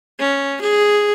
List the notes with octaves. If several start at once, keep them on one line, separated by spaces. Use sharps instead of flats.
C#4
G#4